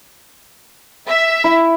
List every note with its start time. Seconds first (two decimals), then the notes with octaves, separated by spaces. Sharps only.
1.08 E5
1.44 E4